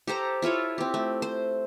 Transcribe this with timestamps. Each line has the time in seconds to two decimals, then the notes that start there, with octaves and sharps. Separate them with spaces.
0.07 G4 A4 C5 A#5
0.42 E4 F4 A4 C#5
0.78 C4 G4
0.94 A3
1.22 C5